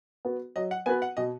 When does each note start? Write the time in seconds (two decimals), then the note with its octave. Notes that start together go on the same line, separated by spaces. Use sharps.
0.25 B3 F#4 B4
0.56 F#3 D#5
0.71 F#5
0.86 B3 F#4 B4 G#5
1.02 F#5
1.17 B2 D#5